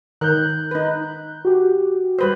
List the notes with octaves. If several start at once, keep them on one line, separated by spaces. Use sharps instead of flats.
D#3 A#4 F#6 G6
D#4 B4
F#4 G4
G3 B4 C5